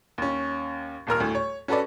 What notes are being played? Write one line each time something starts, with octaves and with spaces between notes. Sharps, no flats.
D#2 C#4
D#1 D#2 A#4 F6
D2 A2
C#5
C#4 F#4 A4 B4 D5